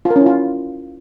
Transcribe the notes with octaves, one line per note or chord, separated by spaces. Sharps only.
F4
A#4
C#4
E4
F4